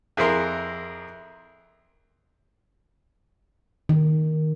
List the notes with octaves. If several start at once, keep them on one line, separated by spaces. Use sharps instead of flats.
F2 E4 G#4 A#4 C6
D#3